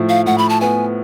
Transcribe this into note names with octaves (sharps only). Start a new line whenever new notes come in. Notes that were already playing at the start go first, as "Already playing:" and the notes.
Already playing: A2 F3
F5
A2 F#5
B5
A5
B3 G#5